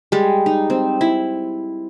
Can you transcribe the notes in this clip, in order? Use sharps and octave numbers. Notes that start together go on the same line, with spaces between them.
G3 G#3
D#4
C4
E4